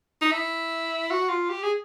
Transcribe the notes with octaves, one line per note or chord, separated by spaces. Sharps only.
D#4
E4
F#4
F4
G4
G#4